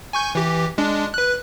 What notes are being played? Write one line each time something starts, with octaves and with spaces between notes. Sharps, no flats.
G#5 C#6 G6
E3 G4
G#3 D4
B4 F#6